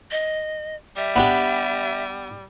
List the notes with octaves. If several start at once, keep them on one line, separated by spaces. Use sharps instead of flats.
D#5
G3 E5
B3 D4 G4